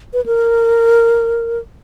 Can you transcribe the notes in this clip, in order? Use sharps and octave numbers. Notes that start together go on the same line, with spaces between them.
B4
A#4